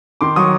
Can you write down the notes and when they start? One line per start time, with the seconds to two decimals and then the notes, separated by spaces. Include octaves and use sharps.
0.21 D#3 C6 D6
0.36 F#3 C#6 D#6